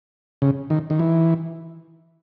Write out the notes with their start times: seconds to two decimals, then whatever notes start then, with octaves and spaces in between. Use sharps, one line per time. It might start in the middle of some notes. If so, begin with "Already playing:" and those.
0.42 C#3
0.70 D#3
0.90 D#3
0.99 E3